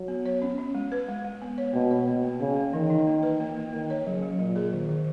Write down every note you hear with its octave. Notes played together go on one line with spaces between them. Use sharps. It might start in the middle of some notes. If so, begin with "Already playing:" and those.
Already playing: F#3
B3
C#5
C#4
C#4
G#3
B4
G#3
G#3
B3
C#5
B2 A#3
C#5
B2 A#3
A#3
C#3 A#3
A#3
D#3 E3
D#4
A#3
B4
A#3
A#3
D#3 A#3
C#5
C#3 F#3
F#3
A#2 F#3
G#4
D#3
D#3